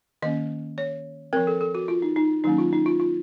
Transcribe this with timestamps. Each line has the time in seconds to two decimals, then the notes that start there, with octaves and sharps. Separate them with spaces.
0.22 D#3 A#3 C#4 D#5
0.78 C#5
1.33 F3 C4 A#4
1.47 A4
1.61 A4
1.75 F#4
1.88 F4
2.02 D#4
2.16 D#4
2.44 D#3 F#3 A#3 C#4 D#4
2.58 F4
2.73 D#4
2.86 F4
3.00 F4